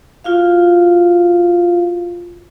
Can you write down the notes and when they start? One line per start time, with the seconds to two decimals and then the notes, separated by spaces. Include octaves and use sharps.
0.24 F4 F#4 F5